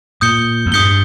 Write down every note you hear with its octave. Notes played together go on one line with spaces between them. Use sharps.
A#2 D#6 G6 C#7 G7
E2
G2 D#6 G6 C#7 G7